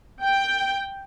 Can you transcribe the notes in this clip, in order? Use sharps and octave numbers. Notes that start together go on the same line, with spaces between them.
G5